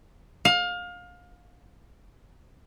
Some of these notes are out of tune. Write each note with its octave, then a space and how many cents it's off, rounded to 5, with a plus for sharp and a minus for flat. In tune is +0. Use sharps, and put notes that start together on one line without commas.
F5 +25